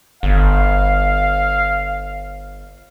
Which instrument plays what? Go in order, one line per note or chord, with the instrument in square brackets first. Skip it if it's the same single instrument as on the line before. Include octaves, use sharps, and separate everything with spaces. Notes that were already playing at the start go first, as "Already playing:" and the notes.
[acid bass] G1 [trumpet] F5